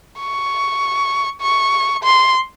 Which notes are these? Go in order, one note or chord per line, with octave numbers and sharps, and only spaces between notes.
C#6
C#6
C6